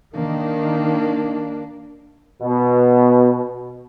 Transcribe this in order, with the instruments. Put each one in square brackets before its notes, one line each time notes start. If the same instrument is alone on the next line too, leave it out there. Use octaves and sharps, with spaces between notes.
[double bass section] D#3 [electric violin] A#3 D4
[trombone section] B2